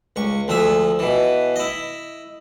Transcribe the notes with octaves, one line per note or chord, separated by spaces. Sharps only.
C#2 C#6
D2 F3 G#4 E5
B2 E3
E4 D#5